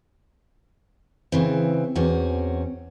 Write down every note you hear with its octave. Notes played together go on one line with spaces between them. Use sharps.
C#3 E3 C4
E2 C4 C#4 F#4